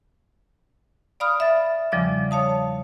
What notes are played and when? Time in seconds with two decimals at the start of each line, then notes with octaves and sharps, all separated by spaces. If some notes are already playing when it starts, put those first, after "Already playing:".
1.20 D5 F5 B5 D#6 F6
1.40 E5 A6
1.92 E2 C#3 F3 G3 D5 D6
2.31 C#5 F5 A5 D#6